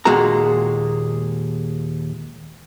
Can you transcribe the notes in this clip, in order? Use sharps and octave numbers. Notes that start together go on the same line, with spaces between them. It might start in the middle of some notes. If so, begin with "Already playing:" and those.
D#2 A#2 G#3 F#4 A4 A#5